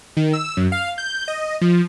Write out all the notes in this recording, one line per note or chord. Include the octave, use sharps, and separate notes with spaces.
D#3
E6
F#2
F5
G6
D#5
F3